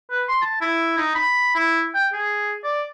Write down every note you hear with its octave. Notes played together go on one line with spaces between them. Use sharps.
B4
C6
A5
E4
D#4
B5
E4
G5
G#4
D5